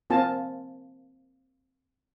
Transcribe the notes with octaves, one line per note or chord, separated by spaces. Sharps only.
A#3 C4 F4 G#5 A5